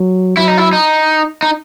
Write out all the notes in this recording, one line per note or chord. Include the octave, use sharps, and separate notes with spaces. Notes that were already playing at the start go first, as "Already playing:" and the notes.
Already playing: F#3
F#3 E4
D#4
E4
D#4
D#4